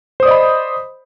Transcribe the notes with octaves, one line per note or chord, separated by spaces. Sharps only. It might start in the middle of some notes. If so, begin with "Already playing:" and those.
C5 D5 D#5 B5 D#6